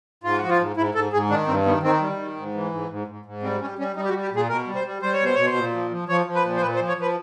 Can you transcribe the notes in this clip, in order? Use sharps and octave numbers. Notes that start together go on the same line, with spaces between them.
G#2 F4
F3 F#4
F4
G#2
G#2 E4
G#2 A4
G#2 G#4
D#3 D4
G2 C4
D#3 B3
D#3 C4
G3
D#3
G#2
E3
G#2
G#2
G#2
G#2
G3 C4
G3 C#4
G3 C#4
G3 D#4
G4
F#4
G3
G4
A#2 G#4
B2 A#4
G3
C5
G3
G3 C5
C#5
B2 C5
B2 C#5
C5
A#2
F3
F3
F3 C#5
F3
B4
A#2
C5
A#2 B4
C5
F3
C#5
F3 B4